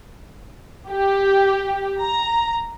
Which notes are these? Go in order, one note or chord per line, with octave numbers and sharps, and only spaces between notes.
G4
A#5